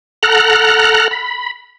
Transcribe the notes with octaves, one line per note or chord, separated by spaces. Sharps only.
A4 F#5 A#5 F6 F#6
B5